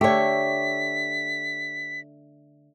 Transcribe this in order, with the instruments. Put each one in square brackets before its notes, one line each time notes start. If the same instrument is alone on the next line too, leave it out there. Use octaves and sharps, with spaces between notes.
[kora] D3 A3 [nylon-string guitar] G4 C#5 [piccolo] B6